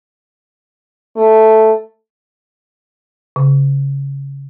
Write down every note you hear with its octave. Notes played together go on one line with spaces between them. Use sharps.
A3
C#3